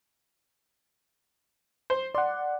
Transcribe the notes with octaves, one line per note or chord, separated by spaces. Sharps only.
C5
D5 F#5 C6